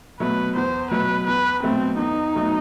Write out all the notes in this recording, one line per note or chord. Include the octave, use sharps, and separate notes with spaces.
B2 F#3 A3 B4
E2 C5
B2 F#3 A3 B4
E2 B4
B2 F#3 A3 C4
E2 D#4
B2 F#3 A3